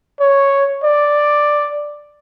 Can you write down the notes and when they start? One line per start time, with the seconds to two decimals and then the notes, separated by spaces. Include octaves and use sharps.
0.20 C#5
0.84 D5